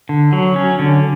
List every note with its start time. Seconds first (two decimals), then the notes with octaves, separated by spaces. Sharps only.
0.09 D3
0.33 F#3
0.56 C#4
0.79 D3